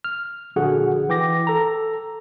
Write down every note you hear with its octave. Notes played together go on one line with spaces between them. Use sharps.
F6
A#1 D3 F#4 G#4 F#5
E3 G5 D6 A#6
A4 A#5